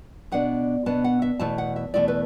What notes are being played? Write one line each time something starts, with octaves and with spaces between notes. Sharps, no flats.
B2 B3 D4 F#5
B2 B3 D4 A5
F#5
E5
E2 B2 A3 E4 A5
F#5
E5
E2 B2 A3 E4 D5
B4